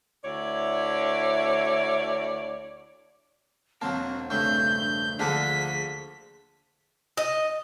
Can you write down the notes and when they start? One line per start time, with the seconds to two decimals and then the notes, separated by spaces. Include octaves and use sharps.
0.23 D2 E4 C#5 D5
3.82 E1 F#3 A#3 C4 C5 A5
4.30 G2 C#3 A3 D4 G6
5.19 D2 D3 F3 A#3 D4 G#4 A5 B6
7.17 D#5